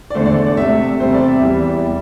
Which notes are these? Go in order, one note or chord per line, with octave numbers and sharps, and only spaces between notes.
D5
E2 D3 A3 C5
D5
D5
D5
C3 A3 E5
E2 C3 G3 C5
D5
E5
E2 E3 G3
G3